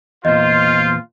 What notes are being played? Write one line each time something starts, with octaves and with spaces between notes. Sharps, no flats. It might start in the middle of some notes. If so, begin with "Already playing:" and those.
E2 A#2 F4 C5 D#5